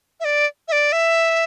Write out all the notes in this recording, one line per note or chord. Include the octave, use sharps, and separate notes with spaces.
E5
D5
E5
D5
E5